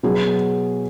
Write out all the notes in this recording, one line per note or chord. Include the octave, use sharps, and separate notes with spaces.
B2 F#3 G#4